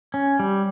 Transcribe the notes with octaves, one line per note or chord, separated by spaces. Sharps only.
C#4
G3